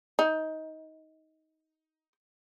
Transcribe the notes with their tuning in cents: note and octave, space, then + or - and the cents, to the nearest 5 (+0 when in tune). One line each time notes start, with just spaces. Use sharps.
D#4 +20